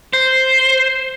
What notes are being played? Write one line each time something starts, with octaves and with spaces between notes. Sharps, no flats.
C5